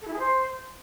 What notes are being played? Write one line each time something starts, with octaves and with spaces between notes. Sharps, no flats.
A4
E4
G#4
C5